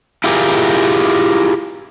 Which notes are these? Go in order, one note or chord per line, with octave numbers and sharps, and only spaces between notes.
E4 F4 G4 G#4 A#4